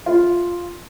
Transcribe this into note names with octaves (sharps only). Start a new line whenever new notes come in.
F4